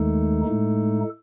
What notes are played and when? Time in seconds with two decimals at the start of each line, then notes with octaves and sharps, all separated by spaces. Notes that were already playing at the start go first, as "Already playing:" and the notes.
Already playing: D#2 D#3 G#3 A3 D#4 A4
0.45 A2 G#3 D#4